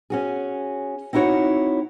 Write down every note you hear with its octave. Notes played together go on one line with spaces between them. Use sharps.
C#4 F#4 G#4
C4 D#4 E4 F#4 C#5 F#5